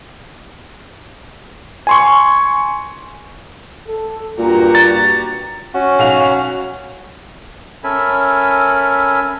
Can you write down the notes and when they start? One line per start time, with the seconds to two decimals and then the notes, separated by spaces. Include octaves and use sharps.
1.87 G#5 C6 C#6
3.88 A4
4.38 G2 A#2 F#4 G4 A#5
4.75 A6
5.74 C#4 F#4
5.99 B1 F5 F7
7.84 C#4 A4 A#4 E5 G#5 B5